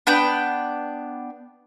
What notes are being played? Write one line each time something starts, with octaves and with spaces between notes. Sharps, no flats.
B3 D4 G5